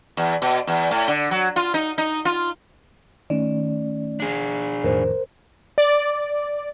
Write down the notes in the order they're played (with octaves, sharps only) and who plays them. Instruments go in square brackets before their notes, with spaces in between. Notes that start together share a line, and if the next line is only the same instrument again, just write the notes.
[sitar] E2
B2
E2
A2
D3
F#3
F4
D#4
D#4
F4
[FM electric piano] D#3 [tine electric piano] A3 C#4 D5
[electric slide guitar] D4 G#4
[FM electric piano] F2 A2 D#3 [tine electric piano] A#4 C5
[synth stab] D5